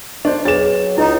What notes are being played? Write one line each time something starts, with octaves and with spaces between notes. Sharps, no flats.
D4 C5 D#5
F#3 D4 G#4 B4 A6 E7
C#2 D#4 E4 A#5